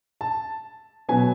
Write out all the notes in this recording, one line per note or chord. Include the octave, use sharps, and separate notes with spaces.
A5
B2 F#3 B3 G#5